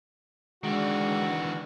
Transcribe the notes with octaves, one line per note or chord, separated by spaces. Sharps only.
D#3 E3 G#3 D4 F#4